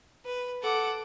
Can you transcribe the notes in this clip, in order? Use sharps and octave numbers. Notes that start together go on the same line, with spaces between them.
B4
A4 F#5 D6